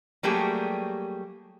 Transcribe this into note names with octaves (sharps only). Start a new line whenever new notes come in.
F#3 G3 A3 A#3 G4 G#4